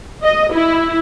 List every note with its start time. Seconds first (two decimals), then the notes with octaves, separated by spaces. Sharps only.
0.23 D#5
0.53 E4